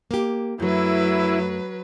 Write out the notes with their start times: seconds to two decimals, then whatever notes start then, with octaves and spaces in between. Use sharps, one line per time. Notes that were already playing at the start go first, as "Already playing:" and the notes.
0.11 A#3 G4
0.60 F#2 F#3 A3 E4 B4